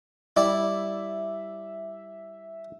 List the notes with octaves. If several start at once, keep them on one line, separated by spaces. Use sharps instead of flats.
G3 E4 D5 E5